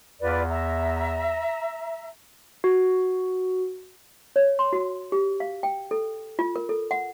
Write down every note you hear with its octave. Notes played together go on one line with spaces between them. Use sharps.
E2 F4 B4 D5
E5 A#5
F#4
C#5
C6
F#4
G4
F5
G5
A4
F4
A#4
A4
F#5